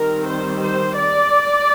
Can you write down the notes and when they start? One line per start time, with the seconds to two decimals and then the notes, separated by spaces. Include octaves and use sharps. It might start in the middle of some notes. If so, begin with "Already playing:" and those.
Already playing: D#3 G3 C4 A#4
0.26 C5
0.61 C5
0.97 D5